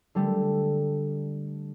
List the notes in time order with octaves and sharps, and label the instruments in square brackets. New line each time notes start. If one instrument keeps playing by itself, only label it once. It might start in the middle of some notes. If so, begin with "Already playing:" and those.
[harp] D3 G3 A3